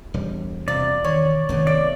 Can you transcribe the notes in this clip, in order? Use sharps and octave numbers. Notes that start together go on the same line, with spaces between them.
E1 G3
C3 F4 D5
D#3 C#5
F1 D#3 A3 B3
D5 E5